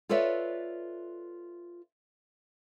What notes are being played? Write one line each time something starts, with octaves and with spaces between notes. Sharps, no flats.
F4 A4 B4 C#5 D5 E5